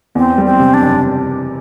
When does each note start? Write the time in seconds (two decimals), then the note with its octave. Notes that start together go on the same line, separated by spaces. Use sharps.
0.15 E2 C4
0.38 G3
0.45 C4
0.59 C3
0.74 D4
0.82 F#1